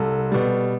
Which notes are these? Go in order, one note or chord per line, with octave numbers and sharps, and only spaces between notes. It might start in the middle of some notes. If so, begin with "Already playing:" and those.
Already playing: C2 A4
B2 G3